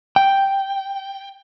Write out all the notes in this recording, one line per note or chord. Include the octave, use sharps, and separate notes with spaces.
G5